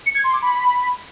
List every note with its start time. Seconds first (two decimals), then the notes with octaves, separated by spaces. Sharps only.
0.06 C#7
0.15 G#6
0.24 C6
0.33 D6
0.42 B5